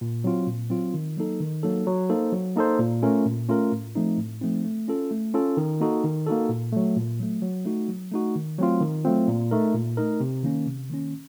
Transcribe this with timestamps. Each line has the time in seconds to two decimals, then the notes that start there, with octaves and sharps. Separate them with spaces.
0.01 A#2
0.24 F#3 C4 F4
0.47 A#2
0.70 F#3 C4 F4
0.94 D#3
1.17 F#3 A#3 D#4 A4
1.40 D#3
1.63 F#3 A#3 D#4 A4
1.87 F#3
2.09 A#3 D#4 A4 C5
2.32 F#3
2.56 A#3 D#4 A4 C5
2.79 A#2
3.02 A3 C#4 F4 A#4
3.25 A#2
3.49 A3 C#4 F4 A#4
3.72 A2
3.95 F3 A3 C4 D#4
4.17 A2
4.41 F3 A3 C4 D#4
4.64 A3
4.88 C#4 F4 A4
5.11 A3
5.34 C#4 F4 A4
5.57 D#3
5.80 A#3 D#4 F#4 A4
6.04 D#3
6.27 A#3 D#4 F#4 A4
6.49 A#2
6.72 F#3 A3
6.96 A#2
7.20 F#3 A3
7.42 F#3
7.65 A3 D#4 F#4
7.88 F#3
8.12 A3 D#4 F#4
8.35 D#3
8.58 F#3 A3 C4 F4
8.81 D#3
9.05 F#3 A3 C4 F4
9.28 A#2
9.51 A3 D#4 A#4
9.74 A#2
9.97 A3 D#4 A#4
10.20 C3
10.43 D#3 A#3 C#4
10.66 C3
10.90 D#3 A#3 C#4